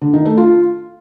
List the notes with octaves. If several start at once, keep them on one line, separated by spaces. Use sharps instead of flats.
D3
D#3
A3
F4